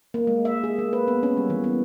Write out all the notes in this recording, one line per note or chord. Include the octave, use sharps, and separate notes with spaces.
A#3
G#3
E5
G#4
A#3
B4
B3
C#4
G3
E3
B3